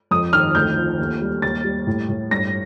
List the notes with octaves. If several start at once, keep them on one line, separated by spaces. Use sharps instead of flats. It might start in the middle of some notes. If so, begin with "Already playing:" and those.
F2 D#6
D#3 F6
D2 G6
F3
D#2
G3
D#2 A6
G3
A2
A2
G2 A#6